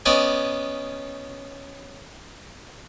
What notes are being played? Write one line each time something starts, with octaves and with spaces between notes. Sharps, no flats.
B3 C#4 D5 D#5 G#5